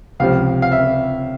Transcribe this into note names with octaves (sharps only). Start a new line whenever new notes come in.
C#2 C3 F3 F5
F5
E5